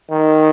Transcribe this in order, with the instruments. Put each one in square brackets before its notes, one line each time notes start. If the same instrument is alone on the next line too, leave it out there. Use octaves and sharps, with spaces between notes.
[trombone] D#3